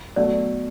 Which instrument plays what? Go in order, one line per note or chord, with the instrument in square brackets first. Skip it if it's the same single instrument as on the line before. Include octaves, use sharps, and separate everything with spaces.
[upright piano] B2 F#3 A3 [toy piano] D5